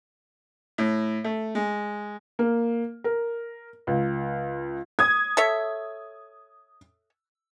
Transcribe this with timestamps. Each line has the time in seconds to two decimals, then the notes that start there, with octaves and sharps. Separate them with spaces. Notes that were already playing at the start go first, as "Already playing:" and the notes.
0.78 A2
1.24 A3
1.55 G#3
2.39 A#3
3.04 A#4
3.87 C#2
4.99 D#6 G#6
5.37 A4 C#5 E5